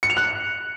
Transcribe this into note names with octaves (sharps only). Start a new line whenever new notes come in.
C#7
F7
F#6